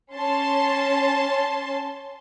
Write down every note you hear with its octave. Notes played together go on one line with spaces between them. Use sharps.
C#4 A5 C6